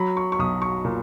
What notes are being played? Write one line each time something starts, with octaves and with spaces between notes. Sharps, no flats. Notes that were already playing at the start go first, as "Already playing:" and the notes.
Already playing: F#3 B5
C#6
C#6
B1 D#6
C#6
A#2